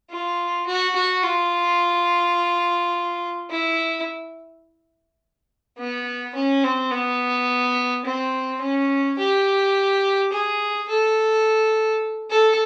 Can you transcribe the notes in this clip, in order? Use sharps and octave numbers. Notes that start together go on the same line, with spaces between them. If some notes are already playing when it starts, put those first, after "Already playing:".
F4
F#4
F#4
F4
E4
B3
C#4
C4
B3
C4
C#4
G4
G#4
A4
A4